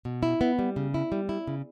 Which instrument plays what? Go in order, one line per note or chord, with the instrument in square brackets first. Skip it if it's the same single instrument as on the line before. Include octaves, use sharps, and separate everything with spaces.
[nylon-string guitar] B2
E4
B3
G3
C#3
E4
G3
E4
C#3